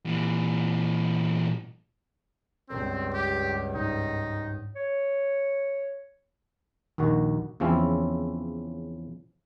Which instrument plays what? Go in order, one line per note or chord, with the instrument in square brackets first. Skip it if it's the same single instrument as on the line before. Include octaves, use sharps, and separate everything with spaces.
[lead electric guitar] A#2 E3
[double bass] C#2 G2 [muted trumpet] C4
[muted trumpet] G4
[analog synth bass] G#2 [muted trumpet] D#4
[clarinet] C#5
[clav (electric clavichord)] A#1 D#2 D#3 F#4
E2 C#3 F3 C4 C#4 E4